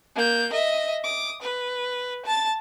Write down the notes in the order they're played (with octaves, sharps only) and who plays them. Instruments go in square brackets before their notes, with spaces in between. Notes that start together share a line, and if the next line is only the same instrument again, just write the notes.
[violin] A#3 G6
D#5 E5
D6 D#6
B4
A5 A6